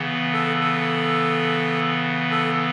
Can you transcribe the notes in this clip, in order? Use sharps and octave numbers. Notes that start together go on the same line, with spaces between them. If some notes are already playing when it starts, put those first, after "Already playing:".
Already playing: C#3 E3 B3
A4
A4
A4